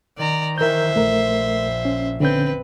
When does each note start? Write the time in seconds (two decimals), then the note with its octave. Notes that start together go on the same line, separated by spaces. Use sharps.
0.18 D#3 D5 A#5
0.58 D#3 E3 A#4 C5 E5 G6
0.96 A#1 A3 A#4
1.85 C#4
2.20 D3 C4 C#4 B4 G6